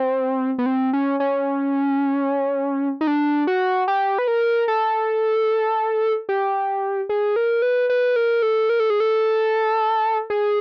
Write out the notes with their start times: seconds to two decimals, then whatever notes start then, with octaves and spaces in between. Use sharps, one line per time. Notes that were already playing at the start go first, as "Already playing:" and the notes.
Already playing: C4
0.59 B3
0.66 C4
0.93 C#4
1.20 C#4
3.01 D#4
3.07 D4
3.47 F#4
3.88 G4
4.18 B4
4.28 A#4
4.68 A4
6.29 G4
7.09 G#4
7.36 A#4
7.62 B4
7.90 B4
8.16 A#4
8.42 A4
8.70 A#4
8.80 A4
8.90 G#4
9.00 A4
10.30 G#4